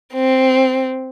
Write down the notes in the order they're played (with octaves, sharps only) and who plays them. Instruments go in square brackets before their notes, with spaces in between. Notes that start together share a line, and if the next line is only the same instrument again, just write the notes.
[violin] C4